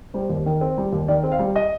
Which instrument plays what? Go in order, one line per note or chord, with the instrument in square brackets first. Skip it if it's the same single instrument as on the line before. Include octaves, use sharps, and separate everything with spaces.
[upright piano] G3 C5
D#2
D#3
C4
G3
D#2
D#3 D5
C4
F5
G3
D#5